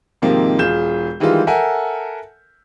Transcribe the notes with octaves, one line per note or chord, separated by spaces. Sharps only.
G#2 C3 D#3 F3 A#3 C4
E1 F4 G#4 G6 E7
D#3 E3 G3 G#3 F4
A4 A#4 E5 F#5 G#5